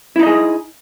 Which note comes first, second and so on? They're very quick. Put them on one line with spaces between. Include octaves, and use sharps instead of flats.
E4 D#4 D#5 G#4